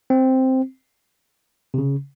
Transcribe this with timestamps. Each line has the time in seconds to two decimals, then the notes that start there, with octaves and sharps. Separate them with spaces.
0.10 C4
1.74 C3
1.78 C#3